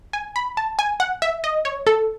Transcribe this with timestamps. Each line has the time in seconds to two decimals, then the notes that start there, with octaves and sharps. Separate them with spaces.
0.13 G#5
0.36 B5
0.57 A5
0.79 G#5
1.00 F#5
1.22 E5
1.44 D#5
1.65 C#5
1.87 A4